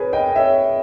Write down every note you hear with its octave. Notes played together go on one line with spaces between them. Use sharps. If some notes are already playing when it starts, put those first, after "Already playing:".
Already playing: G#4 A#4 B4 C#5
D#5 G5
C#5 E5